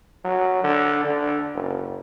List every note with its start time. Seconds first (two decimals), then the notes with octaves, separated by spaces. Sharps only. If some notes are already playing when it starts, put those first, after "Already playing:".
0.24 F#3
0.64 D3
1.04 D3
1.54 F#1